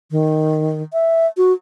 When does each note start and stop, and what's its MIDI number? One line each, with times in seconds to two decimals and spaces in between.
0.11 0.82 51
0.93 1.27 76
1.37 1.53 66